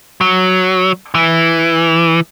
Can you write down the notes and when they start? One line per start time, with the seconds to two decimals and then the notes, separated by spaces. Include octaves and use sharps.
0.21 F#3
1.15 E3